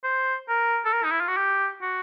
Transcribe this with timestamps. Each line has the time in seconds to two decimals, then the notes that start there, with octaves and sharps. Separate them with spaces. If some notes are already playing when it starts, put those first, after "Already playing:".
0.04 C5
0.49 A#4
0.85 A4
0.93 A#4
1.04 D#4
1.12 E4
1.21 F4
1.28 F#4
1.37 G4
1.82 F#4